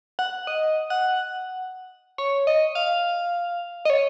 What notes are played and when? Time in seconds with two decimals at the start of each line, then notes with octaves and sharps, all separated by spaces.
0.19 F#5
0.47 D#5
0.90 F#5
2.18 C#5
2.47 D#5
2.75 F5
3.85 D#5
3.90 C#5